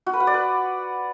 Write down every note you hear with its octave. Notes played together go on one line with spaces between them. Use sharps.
F#4
B4
F#5
D5
B4